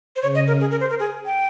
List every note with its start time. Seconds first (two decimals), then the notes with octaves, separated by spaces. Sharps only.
0.16 C5
0.22 C#3 C#5
0.35 D#5
0.47 A#4
0.61 G#4
0.71 A#4
0.80 C5
0.90 A#4
0.99 G#4
1.25 G5